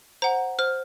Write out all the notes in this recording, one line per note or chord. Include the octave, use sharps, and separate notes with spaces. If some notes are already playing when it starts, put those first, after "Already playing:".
C5 F#5 A#5
C5 F6